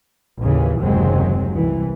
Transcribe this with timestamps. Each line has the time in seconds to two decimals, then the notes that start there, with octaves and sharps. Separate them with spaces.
0.42 A1 D#2 C#3 E3
0.80 F#1 D#2 C3 F#3 G#3 C4
1.55 C2 E3